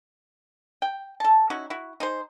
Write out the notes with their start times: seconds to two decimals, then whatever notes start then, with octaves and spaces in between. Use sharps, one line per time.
0.82 G5
1.20 A4 A5
1.50 C#4 D#4 E4 F#4
1.70 E4 F#4
2.00 D#4 G#4 C5